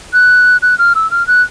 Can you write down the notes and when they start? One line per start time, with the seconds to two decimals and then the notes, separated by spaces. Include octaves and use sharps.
0.13 F#6
0.62 F#6
0.79 F6
0.95 E6
1.11 F6
1.27 F#6